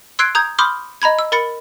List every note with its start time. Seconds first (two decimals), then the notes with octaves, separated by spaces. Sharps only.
0.19 C6 E6 F#6 G#6 C7 D7
0.35 A#5 D#6 G6 G#6
0.59 B5 C6 D6 D#6 F6 G6
1.02 D#5 A#5 B5 G#6
1.19 E6
1.32 A#4 B5 A6 C#7